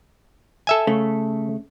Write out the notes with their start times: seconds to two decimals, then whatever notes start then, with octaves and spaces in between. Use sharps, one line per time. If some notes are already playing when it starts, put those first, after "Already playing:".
0.67 A4 E5 G#5
0.87 C#3 A3